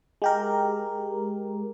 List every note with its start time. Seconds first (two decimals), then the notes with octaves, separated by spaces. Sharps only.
0.22 G#3 G4 A#4